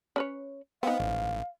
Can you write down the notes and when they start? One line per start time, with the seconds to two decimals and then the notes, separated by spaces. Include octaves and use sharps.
0.16 C#4 B4 C#5
0.83 B3 C4 D#4 F5
1.00 A1